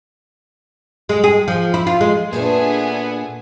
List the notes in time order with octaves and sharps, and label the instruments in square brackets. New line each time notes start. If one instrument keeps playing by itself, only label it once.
[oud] G#3
G#4
F3
E4
F4
G#3
[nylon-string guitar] A#2 [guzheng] A3 B4 C5 [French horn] B3 [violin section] D4 G#4 E5